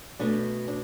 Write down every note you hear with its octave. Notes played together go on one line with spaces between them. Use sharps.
B2 A3 D4
D4